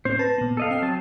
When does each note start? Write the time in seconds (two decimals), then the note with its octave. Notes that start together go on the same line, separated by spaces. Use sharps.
0.05 A2 C4 C#4 C5
0.19 B4 A5 A#6
0.38 A#2 B3
0.57 A4 D#5 F5
0.71 C4 G5 C7
0.82 F#3 A5